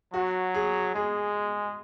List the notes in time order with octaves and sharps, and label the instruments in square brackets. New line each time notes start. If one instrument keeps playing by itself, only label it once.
[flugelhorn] F#3 [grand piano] F#4
[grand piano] G#4
[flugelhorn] G#3 [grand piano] G#4